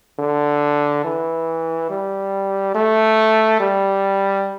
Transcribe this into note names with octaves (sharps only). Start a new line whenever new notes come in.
D3
E3
G3
A3
G3